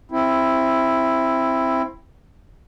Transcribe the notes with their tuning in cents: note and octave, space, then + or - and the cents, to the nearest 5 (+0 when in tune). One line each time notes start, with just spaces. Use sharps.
C4 +10 E4 +5